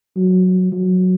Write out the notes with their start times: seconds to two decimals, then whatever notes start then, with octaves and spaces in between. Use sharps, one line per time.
0.16 F#3
0.72 F#3